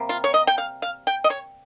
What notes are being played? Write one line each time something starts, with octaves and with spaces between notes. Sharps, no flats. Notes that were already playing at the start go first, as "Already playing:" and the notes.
Already playing: C3 G3 A#3
F4
C#5
D#5
G5
F5
F5
G5
D#5
C#5